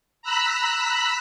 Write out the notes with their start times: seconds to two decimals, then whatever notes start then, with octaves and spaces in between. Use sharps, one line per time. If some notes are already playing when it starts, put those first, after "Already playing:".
0.22 A#5 B5 E6 F#6 B6